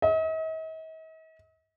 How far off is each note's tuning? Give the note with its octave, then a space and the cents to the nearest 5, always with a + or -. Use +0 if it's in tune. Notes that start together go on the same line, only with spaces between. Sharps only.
D#5 +45